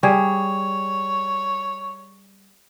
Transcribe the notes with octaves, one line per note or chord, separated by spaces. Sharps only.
G3 G#4 C#5